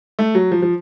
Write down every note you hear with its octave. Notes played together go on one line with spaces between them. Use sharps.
A3
F#3
F3
F3